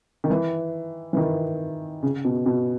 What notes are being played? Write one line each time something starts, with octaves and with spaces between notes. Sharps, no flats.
D#3
E3
E3
D#3
C#3
B2
B2